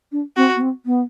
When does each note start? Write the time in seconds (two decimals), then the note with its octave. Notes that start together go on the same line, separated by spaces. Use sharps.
0.12 D4
0.37 C4 F#4
0.56 B3
0.61 C4
0.86 B3